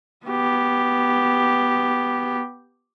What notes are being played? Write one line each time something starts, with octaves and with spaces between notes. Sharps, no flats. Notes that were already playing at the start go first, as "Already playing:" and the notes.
B3 G4